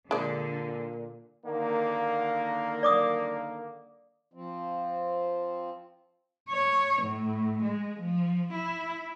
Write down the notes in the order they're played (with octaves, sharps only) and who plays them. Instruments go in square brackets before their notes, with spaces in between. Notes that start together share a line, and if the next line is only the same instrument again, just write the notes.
[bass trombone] A#2 [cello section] D3 [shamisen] G#3 D5
[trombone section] D3 D#3 A#3
[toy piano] D5 D6 D#6
[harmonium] F3 C4
[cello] C#5
A2
G#3
F3
E4